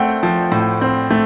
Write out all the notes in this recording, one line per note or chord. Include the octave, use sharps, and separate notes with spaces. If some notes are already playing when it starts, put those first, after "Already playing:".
Already playing: A3 C4 F#5 G5
F3
A2
C4
A3